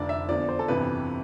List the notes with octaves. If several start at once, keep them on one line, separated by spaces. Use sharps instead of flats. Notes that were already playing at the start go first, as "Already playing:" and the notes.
Already playing: F1 F2 D3 D5
E5
E2 D3 F3 D5
C5
A4
G1 F2 C3 E3 B4